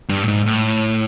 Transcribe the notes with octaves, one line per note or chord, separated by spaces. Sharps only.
G2
A2
G#2
A2